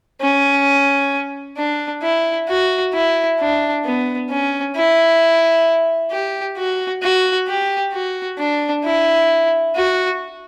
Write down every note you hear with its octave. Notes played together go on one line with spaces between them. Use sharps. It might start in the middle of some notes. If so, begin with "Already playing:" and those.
C#4
D4
E4
F#4
E4
D4
B3
C#4
E4
G4
F#4
F#4
G4
F#4
D4
E4
F#4